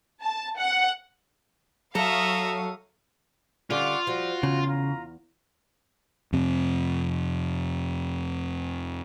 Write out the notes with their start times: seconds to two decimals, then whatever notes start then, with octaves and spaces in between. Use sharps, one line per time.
0.21 A5
0.58 F#5
1.95 F#3 A4 E5 F5 A#5 C#6 D#6
3.70 D3 G3 C#4 F4 F#5 C#6 D6
4.07 F3 G3 F#4
4.43 E2 C#3
4.67 F4 A#5
6.33 F2 C3